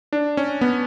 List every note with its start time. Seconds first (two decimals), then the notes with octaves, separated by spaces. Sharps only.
0.13 D4
0.37 C#4
0.61 B3